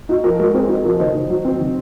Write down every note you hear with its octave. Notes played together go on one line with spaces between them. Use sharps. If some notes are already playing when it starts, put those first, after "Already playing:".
D#4 F#4
F3 F#4 A#4
G#3 F#4 A#4
C4 G#4 C5
C5
D#4 F#4 A#4
F3 F#4 A#4
D#3 C5 D#5
D#3
F#3
C4
D#3